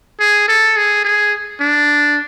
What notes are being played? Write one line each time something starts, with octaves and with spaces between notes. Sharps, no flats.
G#4
A4
G#4
G#4
D4